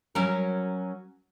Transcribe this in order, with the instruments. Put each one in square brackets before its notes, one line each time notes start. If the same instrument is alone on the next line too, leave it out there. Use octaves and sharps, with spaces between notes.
[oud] F#3 C#4 A#4